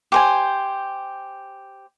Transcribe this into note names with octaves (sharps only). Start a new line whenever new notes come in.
G4 C5 G#5